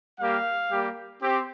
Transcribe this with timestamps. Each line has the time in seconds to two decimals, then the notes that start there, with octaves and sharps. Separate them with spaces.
0.20 G3 A#3 G4 F5
0.71 G3 A#3 G4
1.22 C4 G4